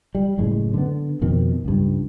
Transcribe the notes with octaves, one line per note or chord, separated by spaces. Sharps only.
G3
F#1 F#2 A2 G#3
D3 B3
F2 B2 D#3 C4
C#2 G2